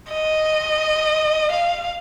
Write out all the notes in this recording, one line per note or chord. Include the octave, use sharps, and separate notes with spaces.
D#5
F5